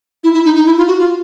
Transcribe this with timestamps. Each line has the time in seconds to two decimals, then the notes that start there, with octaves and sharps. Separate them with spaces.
0.24 E4
0.34 E4
0.45 D#4
0.56 D#4
0.66 E4
0.78 F4
0.88 F#4
0.99 F4